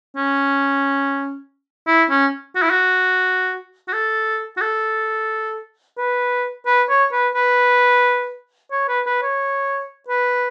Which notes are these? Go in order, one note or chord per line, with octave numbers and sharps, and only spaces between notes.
C#4
E4
C#4
F#4
E4
F#4
F#4
A4
F#4
A4
B4
B4
C#5
B4
B4
C#5
B4
B4
C#5
B4